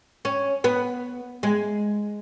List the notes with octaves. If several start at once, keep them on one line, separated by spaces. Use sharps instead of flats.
C#4
B3
G#3